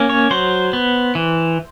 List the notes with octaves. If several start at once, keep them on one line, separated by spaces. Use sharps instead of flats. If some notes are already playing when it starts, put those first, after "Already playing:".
Already playing: A#3 C#4
C#5
F#3 C5
B3
E3